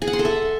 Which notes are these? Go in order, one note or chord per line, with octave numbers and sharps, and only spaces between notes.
G#4
F#5
C6
A4
E5